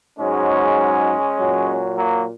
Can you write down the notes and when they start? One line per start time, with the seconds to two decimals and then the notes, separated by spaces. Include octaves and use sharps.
0.19 G#2 F#3 G#3 C#4
1.37 A#2 F#3
1.97 F#3 A#3